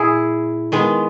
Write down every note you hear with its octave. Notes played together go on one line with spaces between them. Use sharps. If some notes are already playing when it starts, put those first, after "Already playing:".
Already playing: A#2 E4 G#4
D#3 G#3 B3